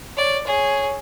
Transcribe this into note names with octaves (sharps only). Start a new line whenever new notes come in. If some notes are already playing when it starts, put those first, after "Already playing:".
C#5 D5
G#4 C#5